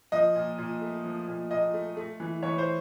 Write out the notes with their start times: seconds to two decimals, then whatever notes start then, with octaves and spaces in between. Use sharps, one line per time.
0.12 F3 D#5
0.36 A#2
0.58 A#2
0.82 A3
1.04 F3
1.28 A#2
1.51 A#2 D#5
1.74 A3
1.97 A3
2.20 E3
2.43 E3 C#5
2.58 C5